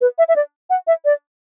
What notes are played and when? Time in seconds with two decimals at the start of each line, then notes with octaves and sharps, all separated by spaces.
0.01 B4
0.18 E5
0.28 E5
0.36 D5
0.70 F#5
0.87 E5
1.05 D5